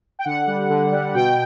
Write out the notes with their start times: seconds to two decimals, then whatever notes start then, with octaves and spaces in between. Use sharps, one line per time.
0.19 G5
0.25 D3 F#5
0.47 G3
0.70 D3
0.92 G3
1.14 B2 G5